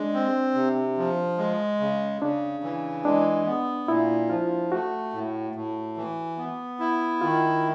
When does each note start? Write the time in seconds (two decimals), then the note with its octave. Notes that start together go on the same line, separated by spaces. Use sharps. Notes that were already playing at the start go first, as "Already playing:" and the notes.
Already playing: G#3 D4
0.13 C4
0.55 C3
0.97 F3
1.38 G#3
1.80 C#3
2.22 C#3 D4
2.63 E3
3.05 G#3 D4
3.46 B3
3.88 A#2 E4
4.30 F3 F4
4.72 A3 F#4
5.14 A2
5.55 A2
5.97 E3
6.38 B3
6.80 E4
7.21 D#3 F4